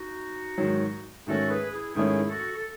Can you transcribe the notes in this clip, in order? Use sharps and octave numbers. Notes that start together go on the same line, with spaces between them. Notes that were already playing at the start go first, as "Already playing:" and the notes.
Already playing: D#4 F#4
G#2 D#3 F#3
G#2 D#3 A3 C#4 F#4 A4
G#4 B4
E4 G#4
G#2 D#3 A3 C#4 E4 G#4
F#4 A4
A4